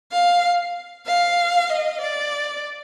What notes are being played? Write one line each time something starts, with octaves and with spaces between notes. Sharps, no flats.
F5
F5
D#5
D5